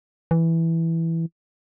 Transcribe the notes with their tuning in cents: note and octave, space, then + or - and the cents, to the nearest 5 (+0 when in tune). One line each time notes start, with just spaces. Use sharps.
E3 +0